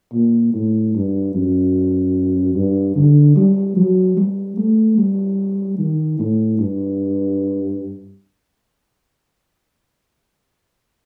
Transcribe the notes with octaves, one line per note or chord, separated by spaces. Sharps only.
A#2
A2
G2
F#2
G2
D3
G3
F#3
G3
A3
G3
D#3
A2
G2